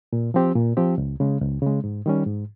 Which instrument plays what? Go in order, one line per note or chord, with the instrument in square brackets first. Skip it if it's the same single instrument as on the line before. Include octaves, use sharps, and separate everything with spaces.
[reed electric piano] A#2
F3 C4 G4
A#2
F3 C4 G4
C#2
C#3 G#3
C#2
C#3 G#3
G#2
D#3 G3 C#4
G#2